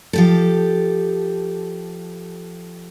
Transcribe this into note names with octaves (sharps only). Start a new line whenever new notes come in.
F3 G4 A4